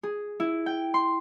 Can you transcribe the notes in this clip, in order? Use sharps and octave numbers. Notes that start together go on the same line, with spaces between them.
G#4
E4
G5
C6